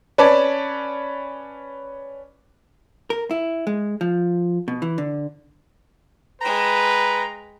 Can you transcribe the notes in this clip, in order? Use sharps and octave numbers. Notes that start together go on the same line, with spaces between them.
C#4 B4 D5 A5
A#4
E4
G#3
F3
B2
E3
D3
G#3 B4 G5 A#5